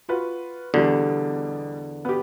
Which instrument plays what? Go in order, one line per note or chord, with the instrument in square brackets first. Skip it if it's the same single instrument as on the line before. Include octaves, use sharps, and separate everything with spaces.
[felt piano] F4 F#4 B4
[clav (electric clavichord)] E2 D3 [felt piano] B2 G3
[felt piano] B3 G4